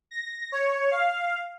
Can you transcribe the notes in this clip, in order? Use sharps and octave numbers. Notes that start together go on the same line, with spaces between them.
A#6
C#5
F5